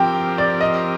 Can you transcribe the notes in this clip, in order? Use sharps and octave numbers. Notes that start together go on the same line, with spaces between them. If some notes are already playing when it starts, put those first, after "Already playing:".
Already playing: F3 C4 G4 A#4 G5
D5
D#5